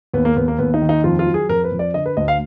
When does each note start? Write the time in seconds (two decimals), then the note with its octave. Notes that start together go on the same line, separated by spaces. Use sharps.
0.14 D#2 B3
0.25 A#3
0.36 D#2 B3
0.48 A#3
0.59 D#2 B3
0.74 D#4
0.81 D#3
0.89 D#4
1.04 F2 F4
1.19 F4
1.27 F#3
1.34 G#4
1.49 F2 A#4
1.64 B4
1.72 F2
1.79 D5
1.94 D3 D#5
2.06 B4
2.17 D2 D#5
2.28 F5